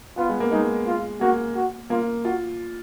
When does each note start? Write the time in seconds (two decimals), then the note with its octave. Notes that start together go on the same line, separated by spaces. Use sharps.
0.18 B3 F4
0.29 G#3
0.40 A#3
0.52 G#3 D#4
0.86 F4
1.21 A#3 F#4
1.56 F#4
1.90 A#3 F4
2.25 F4 F#4